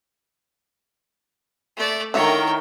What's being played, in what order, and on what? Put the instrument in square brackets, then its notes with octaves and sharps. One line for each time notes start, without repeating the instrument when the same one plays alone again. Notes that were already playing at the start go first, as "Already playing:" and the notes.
[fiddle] A3 D5
[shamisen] D3 E5 [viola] D#3 [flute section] E4 A#4 [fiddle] C#5 G5